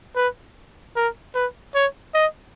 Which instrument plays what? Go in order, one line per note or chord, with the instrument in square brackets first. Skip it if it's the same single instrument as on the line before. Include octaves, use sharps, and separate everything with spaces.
[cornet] B4
A#4
B4
C#5
D#5